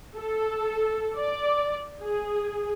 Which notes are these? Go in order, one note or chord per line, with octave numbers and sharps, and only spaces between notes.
A4
D5
G#4